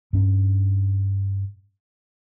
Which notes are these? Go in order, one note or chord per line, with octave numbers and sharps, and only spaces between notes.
G2 C#4